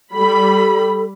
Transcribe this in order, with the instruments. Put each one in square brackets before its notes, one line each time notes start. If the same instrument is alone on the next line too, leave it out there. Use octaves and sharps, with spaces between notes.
[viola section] G3 B5 [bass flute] A4